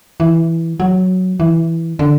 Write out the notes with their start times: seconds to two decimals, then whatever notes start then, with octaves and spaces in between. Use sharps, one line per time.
0.20 E3
0.80 F#3
1.40 E3
1.99 D3